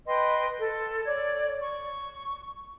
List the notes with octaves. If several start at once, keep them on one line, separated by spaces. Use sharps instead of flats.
B4 D#5 G5 C6
A4
C#5 D5 G#6
C#6